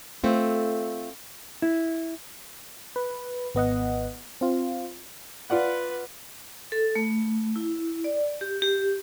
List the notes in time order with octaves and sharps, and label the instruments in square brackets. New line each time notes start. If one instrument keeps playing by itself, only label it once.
[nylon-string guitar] A3 C4 F4
[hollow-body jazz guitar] E4
[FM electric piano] B4
G#1 B3 D#5 F#5
C4 F4
[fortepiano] F4 D5 F#5 [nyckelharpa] B4
[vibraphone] A4
A3
E4
D5
G4
G4